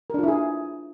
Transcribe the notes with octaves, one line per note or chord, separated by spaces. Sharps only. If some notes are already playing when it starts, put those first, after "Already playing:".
D4 E4 F4 G#4 A#4